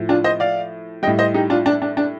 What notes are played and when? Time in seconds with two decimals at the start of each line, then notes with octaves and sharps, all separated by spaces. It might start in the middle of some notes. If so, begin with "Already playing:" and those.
Already playing: A2 F3
0.09 D4 F4
0.24 C5 D#5
0.40 D5 F5
1.03 G3 D#5 G5
1.07 A2
1.19 C5 D#5
1.34 D#4 G4
1.50 D4 F4
1.66 D4
1.82 D4
1.97 D4